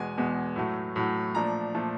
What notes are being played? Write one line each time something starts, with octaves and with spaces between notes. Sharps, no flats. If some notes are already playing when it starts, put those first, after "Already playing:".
Already playing: E2 B2 G#3 G#5
E2 B2 G#3
A2 F#3 A3
A2 F#3 A3
A#2 F3 A3 D4 A#5
A#2 F3 A3 D4